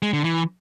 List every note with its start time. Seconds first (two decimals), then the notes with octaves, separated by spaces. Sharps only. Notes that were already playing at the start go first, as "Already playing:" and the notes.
0.02 G#3
0.13 D3
0.24 E3